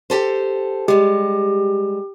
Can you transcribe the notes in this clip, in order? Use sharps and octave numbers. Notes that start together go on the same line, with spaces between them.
G4 A4 C5
G3 G#3 G4